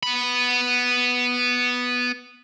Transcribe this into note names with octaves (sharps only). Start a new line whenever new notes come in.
B3 B5